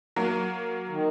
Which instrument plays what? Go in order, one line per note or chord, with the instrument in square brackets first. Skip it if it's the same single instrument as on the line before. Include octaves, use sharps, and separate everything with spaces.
[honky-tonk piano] F#3 A#3
[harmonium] D#3